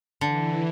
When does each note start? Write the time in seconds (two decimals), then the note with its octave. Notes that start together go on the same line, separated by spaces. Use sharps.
0.21 D3 E3